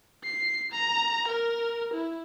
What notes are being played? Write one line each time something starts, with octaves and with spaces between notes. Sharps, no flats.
C7
A#5
A#4
E4